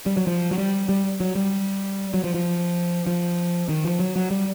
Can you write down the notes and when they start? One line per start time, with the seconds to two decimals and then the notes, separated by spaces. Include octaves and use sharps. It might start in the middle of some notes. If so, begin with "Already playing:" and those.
0.06 G3
0.17 F#3
0.27 F3
0.51 F#3
0.58 G3
0.89 G3
1.20 F#3
1.36 G3
2.14 F#3
2.24 F3
2.34 F3
3.07 F3
3.69 D#3
3.84 F3
4.00 F#3
4.16 F#3
4.31 G3